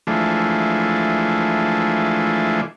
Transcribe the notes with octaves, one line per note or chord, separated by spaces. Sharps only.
E3 F3 G#3 A3 D4